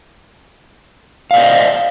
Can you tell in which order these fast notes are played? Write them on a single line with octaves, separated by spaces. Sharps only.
F5 D5 C5 D#5